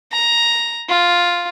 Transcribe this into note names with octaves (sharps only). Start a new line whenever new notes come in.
A#5
F4